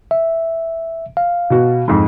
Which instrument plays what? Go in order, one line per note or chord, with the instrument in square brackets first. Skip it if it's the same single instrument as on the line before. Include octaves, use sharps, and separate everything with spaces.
[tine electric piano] E5
F5
[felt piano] B2 F#4
F2 G#2